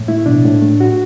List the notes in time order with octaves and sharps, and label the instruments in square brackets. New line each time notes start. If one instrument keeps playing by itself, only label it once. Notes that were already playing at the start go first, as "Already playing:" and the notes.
Already playing: [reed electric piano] A2
A3 E4
B2 D4
A2
A3
F#4